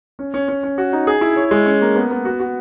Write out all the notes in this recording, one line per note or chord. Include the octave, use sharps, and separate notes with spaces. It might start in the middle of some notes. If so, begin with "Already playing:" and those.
C#4
C#4
C#4
C#4
F#4
D#4
G#4
E4
C#5
G#3
C#4
A#3
B3
B3
F#4
F#4